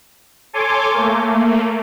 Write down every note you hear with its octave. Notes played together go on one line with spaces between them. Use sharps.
A4 C#5 G#5 C6 D6
A3 A#3